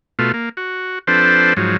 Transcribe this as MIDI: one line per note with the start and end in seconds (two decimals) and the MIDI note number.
0.19 0.32 47
0.19 0.32 57
0.19 0.32 65
0.34 0.49 58
0.57 0.99 66
1.07 1.53 53
1.07 1.53 60
1.07 1.53 62
1.07 1.53 69
1.07 1.53 71
1.07 1.53 72
1.57 1.77 44
1.57 1.77 53
1.57 1.77 54